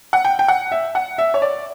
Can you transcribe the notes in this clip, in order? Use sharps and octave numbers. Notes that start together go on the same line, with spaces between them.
F#5
G5
G5
F#5
E5
F#5
E5
C#5
D5